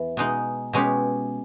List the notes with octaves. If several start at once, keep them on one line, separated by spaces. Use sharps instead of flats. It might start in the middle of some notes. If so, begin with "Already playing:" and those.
Already playing: E2 E3
B2 G#3 D#4
B2 G#3 C#4 G4